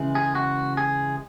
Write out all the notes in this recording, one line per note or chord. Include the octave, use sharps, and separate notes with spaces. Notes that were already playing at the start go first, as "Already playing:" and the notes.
Already playing: C#3 E3 G#3
G#4
F#4
G#4